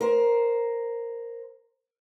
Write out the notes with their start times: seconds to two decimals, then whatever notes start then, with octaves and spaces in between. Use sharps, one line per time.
0.01 A#4 C5